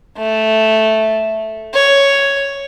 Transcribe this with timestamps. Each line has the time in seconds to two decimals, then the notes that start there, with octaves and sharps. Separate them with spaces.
0.18 A3
1.74 C#5